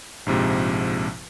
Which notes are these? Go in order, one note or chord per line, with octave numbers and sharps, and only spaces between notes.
A#1 G#2 C3 F3